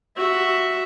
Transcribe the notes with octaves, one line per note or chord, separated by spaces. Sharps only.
F#4 E5